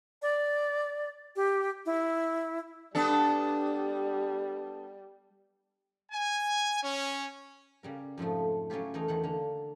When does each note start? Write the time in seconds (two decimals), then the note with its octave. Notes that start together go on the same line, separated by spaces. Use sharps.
0.22 D5
1.36 G4
1.86 E4
2.95 G3 B3 D4 A4
6.12 G#5
6.82 C#4
7.83 C#3 G3 A#4
8.18 F2 G#2 F3 A3
8.70 F#3 C#4 E4 F4 G4
8.94 E2 A3 D#4 A#4
9.08 E2 D#3 F#5
9.24 D3 A#3